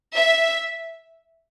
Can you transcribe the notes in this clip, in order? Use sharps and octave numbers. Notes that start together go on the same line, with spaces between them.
E5